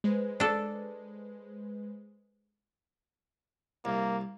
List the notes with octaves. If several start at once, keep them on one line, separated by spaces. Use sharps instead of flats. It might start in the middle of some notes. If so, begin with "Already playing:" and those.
G#3 B4 C5
D4 A4
C2 A#3